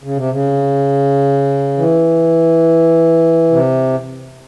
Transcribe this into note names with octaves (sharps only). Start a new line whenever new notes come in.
C#3
C3
C#3
E3
C3